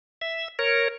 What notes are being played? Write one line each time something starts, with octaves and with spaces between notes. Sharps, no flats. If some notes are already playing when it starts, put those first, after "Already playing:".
E5
A#4 C#5